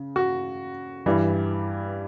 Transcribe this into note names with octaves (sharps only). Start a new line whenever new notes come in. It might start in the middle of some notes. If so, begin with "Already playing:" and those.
Already playing: C#3
F#4
G2 E3 G3